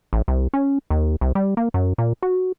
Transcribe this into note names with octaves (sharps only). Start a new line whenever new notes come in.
A1
C2
C#4
D#2
C2
G3
A#3
F#2
A#2
F#4